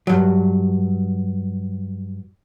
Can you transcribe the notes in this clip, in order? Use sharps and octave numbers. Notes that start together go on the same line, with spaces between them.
G2 F#3